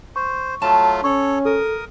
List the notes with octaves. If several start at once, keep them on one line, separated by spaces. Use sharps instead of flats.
C5 C#6
F#3 A3 F4 A5
C#4 A4 C#5 C#6
A4 A#4 D#6